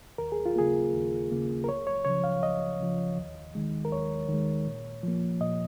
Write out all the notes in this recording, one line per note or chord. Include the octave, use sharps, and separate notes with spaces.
D#2 A#4
G#4
F4
C#3 A#3 G#4
D#2
C#3 A#3
A#4
C#2 C#5
C#5
C#3 F3 C#5
F5
C#2 D#5
C#3 F3
D#2
D#3 G#3
A#4
D#2 C#5
D#3
G#3
A#2
F3 A#3
A#2 D#5